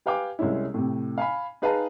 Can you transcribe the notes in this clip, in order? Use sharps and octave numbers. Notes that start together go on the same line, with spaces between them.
G4 B4 F5 G5 G#5 D6
C2 G#3 C#4 E4
A2 C3
F5 G#5 B5
D#4 G#4 B4 F5 A5 A#5